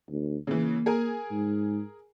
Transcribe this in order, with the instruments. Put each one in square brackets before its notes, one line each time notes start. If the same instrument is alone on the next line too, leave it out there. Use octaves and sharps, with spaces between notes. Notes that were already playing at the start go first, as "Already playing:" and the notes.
[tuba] D2
[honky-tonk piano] C#3 E3 [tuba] A#3
[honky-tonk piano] G#4 A#4 G#5
[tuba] G#2